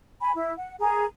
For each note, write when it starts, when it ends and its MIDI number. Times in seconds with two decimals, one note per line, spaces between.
0.21 0.31 80
0.21 0.31 83
0.34 0.52 64
0.57 0.76 78
0.81 1.04 68
0.81 1.04 70
0.81 1.04 80
0.81 1.04 82